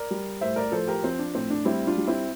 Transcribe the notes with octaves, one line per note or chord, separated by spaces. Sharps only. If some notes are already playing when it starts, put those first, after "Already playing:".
Already playing: A#4 D5
G3
A2 C5 E5
A#4 D5
F3 A4 C5
G4 A#4
F3 C4
D4
A2 C4
D4
G3 C4 E4
D4 F4
G3
C4 E4